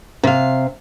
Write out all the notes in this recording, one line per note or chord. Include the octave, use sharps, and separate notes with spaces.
C3 F5